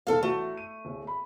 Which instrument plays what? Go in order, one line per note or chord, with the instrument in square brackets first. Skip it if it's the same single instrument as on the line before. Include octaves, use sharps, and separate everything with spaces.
[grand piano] E1 E2 A2 [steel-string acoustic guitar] A4 F5
[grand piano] A1 F#4 [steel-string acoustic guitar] A3
[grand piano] D#7
D1
B5